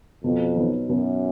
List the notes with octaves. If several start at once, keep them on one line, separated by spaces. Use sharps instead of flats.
F2 B2
F#3 B3 D#4
F#2 B2